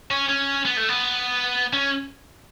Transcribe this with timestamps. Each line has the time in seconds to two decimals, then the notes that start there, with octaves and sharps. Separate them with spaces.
0.11 C#4
0.29 C#4
0.65 B3
0.77 A3
0.89 B3
1.73 C#4